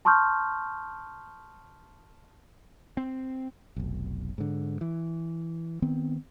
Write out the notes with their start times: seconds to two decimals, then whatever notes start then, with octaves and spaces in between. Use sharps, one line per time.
0.05 A5 C6 C#6 D#6 F6 G6
2.97 C4
3.76 F1 B1
4.38 G#2 D3
4.81 E3
5.82 D#3 B3 C4